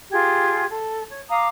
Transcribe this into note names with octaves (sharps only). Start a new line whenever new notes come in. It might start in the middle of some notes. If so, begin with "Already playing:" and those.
F4 G4 G#4 G#6
A4
C#5
F5 A#5 D6 D#6